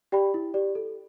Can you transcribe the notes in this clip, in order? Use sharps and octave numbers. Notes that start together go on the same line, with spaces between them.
G4 D5 G5 B5
E4
G4 D5
A4